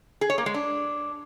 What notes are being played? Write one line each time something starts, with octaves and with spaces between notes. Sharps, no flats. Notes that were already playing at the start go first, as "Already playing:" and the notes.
G#4
C#5
A#3
G#3
D4